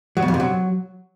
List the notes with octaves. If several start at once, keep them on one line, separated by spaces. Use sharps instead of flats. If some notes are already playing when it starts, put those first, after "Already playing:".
F#3
B2
F2
C3
F#3